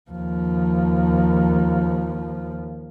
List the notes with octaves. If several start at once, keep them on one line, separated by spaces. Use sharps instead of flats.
D#2 F3